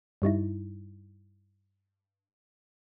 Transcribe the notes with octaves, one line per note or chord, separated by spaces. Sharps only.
G2 G3 D#4 E4